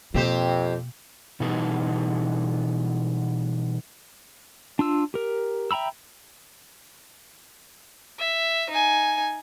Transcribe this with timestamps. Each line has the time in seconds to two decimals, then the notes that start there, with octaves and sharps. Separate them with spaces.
0.14 F2 B2 A#3 C4 G4 C5
1.40 B2 E3 G3 B3 D#4 A4
4.79 D4 F4 E6
5.14 G4 A#4
5.71 E5 G5 A#5 B5 E6
8.19 E5
8.70 D#4 G#5